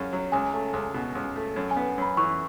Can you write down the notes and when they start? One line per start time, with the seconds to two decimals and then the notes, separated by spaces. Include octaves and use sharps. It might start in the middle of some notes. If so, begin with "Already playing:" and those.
Already playing: F#2 C#3 C#4
0.13 F#3
0.32 C#2 G#5
0.53 A3
0.74 C#2
0.94 B2
1.15 C#2
1.36 A3
1.56 F#2
1.71 G#5
1.76 B3
1.98 F#2 B5
2.17 E3 C#6